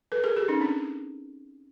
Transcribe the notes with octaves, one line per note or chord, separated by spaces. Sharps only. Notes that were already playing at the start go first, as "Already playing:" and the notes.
A4 B4
G#4 A#4
G4 A4
C#4 D#4
C4 D4